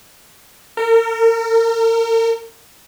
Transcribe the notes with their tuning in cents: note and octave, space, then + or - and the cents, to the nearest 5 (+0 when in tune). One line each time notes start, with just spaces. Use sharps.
A#4 -35